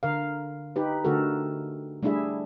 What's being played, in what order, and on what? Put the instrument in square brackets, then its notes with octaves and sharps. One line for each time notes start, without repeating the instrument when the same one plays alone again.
[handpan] D3 A#4 F5
D#4 G4 B4
D3 A3 F#4 A4 A#4
G3 A3 D4 E4 G#4 E5